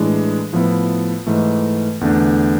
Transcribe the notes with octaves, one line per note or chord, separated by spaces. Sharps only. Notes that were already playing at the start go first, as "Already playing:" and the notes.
Already playing: A2 E3 G#3 D4
A2 F3 B3 E4
G#2 E3 A3
E2 D3 A3 D4